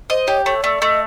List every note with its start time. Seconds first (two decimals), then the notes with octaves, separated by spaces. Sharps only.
0.10 C5 D#5
0.27 G4 C#5
0.45 A3 C#5
0.63 A3 D5
0.81 A3 D#5